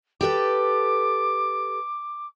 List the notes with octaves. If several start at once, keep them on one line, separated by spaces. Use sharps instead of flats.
G4 A4 B4 D6